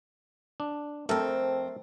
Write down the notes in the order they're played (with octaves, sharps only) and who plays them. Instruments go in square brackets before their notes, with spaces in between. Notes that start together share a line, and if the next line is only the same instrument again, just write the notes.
[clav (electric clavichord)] D4
[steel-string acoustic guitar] F2 C4 [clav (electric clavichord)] A3 A4 A#4